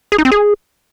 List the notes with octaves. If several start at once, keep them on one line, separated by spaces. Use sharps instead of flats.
G#4
D#4
C4
G#4